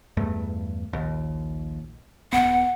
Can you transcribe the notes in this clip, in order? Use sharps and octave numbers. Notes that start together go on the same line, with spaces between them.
E2 G2 A3
A#1 D#2
D#1 F2 B3 F#5